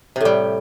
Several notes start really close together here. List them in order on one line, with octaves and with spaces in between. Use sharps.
C3 A2 G3